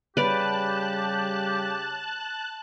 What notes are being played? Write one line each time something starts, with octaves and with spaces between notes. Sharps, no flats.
C#3 G3 G4 B4 D5 A5 F#6